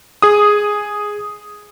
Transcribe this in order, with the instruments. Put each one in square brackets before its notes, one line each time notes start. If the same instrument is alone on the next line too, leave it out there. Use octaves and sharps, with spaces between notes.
[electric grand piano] G#4 D#6